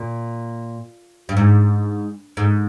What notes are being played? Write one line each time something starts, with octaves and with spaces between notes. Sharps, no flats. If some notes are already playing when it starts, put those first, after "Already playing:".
Already playing: A#2
G2
G#2
G#2